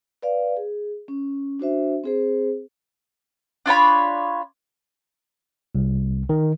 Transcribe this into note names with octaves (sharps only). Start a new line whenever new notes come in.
B4 D5 F5
G#4
C#4
D4 F#4 C5 E5
C4 G#4 C5
D4 F4 C#5 B5
C2
D#3